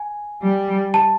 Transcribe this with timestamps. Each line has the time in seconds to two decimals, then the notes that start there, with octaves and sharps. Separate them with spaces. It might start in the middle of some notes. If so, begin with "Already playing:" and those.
Already playing: G#5
0.42 G3
0.94 A5